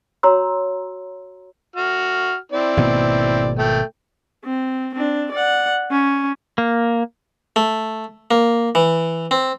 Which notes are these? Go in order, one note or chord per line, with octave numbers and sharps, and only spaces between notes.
F#4 C#5 A#5 C6 E6
F#4 F6
C4 E4 D5
G#1 B2 A#3
A3 G5
C4
C4 D4
D5 F#5
C#4
A#3
A3
A#3
E3
C4